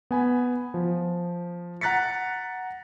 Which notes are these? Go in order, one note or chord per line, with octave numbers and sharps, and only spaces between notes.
B3 G#5 B5
F3
F#5 A#5 F#6 A6 B6 C#7